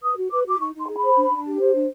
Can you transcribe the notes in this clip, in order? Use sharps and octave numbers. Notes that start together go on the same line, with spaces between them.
B4 D#6
F#4
B4 D6
F#4 D6
D#4 C#6
D#4
C6
G#4
B5
C5
D4
D4
G4
C5
D4